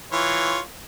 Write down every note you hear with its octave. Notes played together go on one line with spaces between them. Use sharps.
E3 F4 C#5